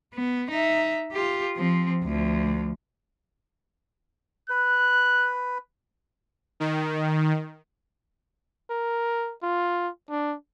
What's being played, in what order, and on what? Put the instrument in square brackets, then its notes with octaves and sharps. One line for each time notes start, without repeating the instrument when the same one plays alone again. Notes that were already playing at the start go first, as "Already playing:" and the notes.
[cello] B3
D#4 E5
F4 G4
F3 C4
D2 F3
[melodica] B4 [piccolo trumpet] F#6
[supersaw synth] D#3
[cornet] A#4
F4
D4